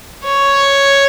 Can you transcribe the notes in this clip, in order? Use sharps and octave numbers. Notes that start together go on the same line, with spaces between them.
C#5